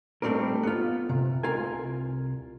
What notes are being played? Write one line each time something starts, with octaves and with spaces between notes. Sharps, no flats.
G3 A3 C4 D4 A#4
B3 F4
C3
C2 F4 A#4 G#5